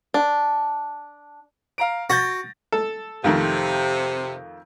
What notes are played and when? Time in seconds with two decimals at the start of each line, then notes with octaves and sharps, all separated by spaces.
0.14 D4
1.78 F5 A#5 D7
2.10 F#4 G6 A6 A#6
2.72 A4
3.24 F2 C3 D#3 A3